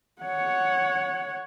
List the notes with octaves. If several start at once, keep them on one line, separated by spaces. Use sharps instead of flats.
C#5 F#5